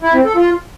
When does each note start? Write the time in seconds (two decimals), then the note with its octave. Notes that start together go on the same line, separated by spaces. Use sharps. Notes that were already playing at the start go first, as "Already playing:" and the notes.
0.02 E4
0.14 C4
0.25 A4
0.36 F4